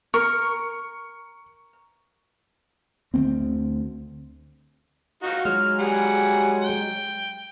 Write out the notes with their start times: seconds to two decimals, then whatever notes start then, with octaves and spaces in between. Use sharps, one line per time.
0.14 A#4 C#6
3.14 D2 D3 A#3 C4
5.23 D#4 F4 F#4
5.45 F#3 G#3 F6
5.79 G3 G#4 F#5
6.62 G5